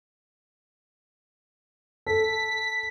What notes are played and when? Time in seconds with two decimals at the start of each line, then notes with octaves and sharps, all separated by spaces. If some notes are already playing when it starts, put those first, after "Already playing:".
2.07 A4 B6